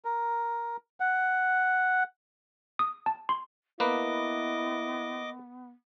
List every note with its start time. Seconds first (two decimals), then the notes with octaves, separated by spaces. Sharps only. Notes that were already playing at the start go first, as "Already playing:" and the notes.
0.05 A#4
1.00 F#5
2.79 D#6
3.06 A5
3.29 C6
3.80 A#3 B3 E4 B4 D#5 D6